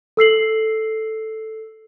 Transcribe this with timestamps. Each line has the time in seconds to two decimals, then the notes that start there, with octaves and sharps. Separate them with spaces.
0.17 A4 E6 C7 F#7